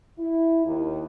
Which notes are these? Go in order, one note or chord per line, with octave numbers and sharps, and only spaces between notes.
E4
D#2